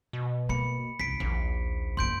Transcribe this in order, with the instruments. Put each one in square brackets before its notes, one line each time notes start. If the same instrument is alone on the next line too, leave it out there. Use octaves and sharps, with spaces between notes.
[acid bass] B2
[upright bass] A#3 [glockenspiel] B5 C#7
[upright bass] C2 [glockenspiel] B6 C7 D7
[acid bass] A#1 [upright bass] D#2
[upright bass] F#2 A#3 [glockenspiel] C6 G6 D7